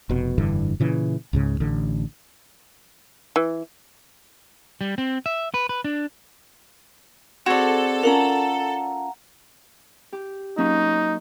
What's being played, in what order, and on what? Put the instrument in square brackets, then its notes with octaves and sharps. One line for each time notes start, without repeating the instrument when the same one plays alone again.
[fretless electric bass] F1 B2
F1 G2 D3 E3
A#2 C#3 E3
C#2 G#2 C#3
A1 D3
[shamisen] E3
[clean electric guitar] G3
C4
E5
B4
B4
D4
[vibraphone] C4 G#4 C5 [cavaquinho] F#4 D5 [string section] A4
[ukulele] C#4 F4 A#4 [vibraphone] F5 F#5 A#5
[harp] G4
[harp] F#3 A#3 C#4 [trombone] D#4